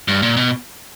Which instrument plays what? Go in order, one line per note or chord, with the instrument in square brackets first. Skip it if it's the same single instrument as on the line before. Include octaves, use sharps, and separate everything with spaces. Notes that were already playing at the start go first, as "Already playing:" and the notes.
[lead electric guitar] G2
A#2
B2